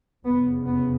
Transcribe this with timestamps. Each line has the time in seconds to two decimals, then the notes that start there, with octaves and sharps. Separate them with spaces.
0.24 F1 E2 C#3 B3
0.66 B3